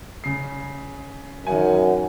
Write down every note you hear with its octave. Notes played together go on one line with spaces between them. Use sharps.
C#3 C7
F#2 D#3 F#5 G#5